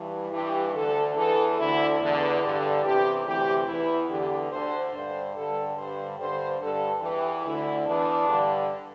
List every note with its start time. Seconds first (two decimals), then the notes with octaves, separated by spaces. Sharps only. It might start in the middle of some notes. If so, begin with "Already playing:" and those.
Already playing: G2 E3
0.31 G2 E3 G4
0.73 D2 D3 A4
1.15 E2 E3 A4
1.57 D2 D3 E4
1.99 E2 D3
2.41 G2 D3
2.83 E2 C3 E3 G4
3.25 D2 C3 E3 G4
3.66 E2 E3 E4
4.08 E2 D3 G4
4.50 D2 D3 C5
4.92 G2 D3 C5
5.35 G2 D3 A4
5.76 G2 D3 C5
6.18 G2 D3 C5
6.60 G2 D3 A4
7.02 E2 E3 G4
7.44 D2 D3 E4
7.86 E2 E3 D4
8.28 G2 D3